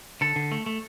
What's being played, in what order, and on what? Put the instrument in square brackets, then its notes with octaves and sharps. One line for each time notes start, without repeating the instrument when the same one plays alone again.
[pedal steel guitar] D3 A4
D3
A3
A3